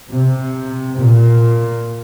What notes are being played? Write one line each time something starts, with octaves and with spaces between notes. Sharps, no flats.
C3
A#2